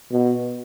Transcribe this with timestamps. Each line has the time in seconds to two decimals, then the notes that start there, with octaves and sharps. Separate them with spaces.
0.11 B2